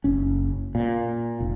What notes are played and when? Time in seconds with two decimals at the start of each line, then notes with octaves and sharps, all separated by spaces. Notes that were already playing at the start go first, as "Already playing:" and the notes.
0.04 F#1 C#4
0.75 A#2
1.40 F1